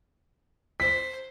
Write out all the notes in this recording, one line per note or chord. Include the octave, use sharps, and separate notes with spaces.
C5 B6